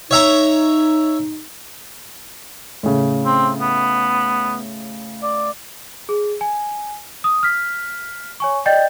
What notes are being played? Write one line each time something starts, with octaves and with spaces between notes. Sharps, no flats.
D#4 C#5 E5 A#5
A2 C#3
C4
B3
D5
G#4
G#5
D#6
F6 B6
C#5 G#5 C#6
D5 D#5 G5 G6 A6